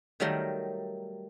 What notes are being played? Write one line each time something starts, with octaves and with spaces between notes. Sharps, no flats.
D#3 F#3 G3 A3 A#4